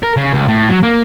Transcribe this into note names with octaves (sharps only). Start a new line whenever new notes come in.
A#4
C#3
C#2
A2
F#3
A#3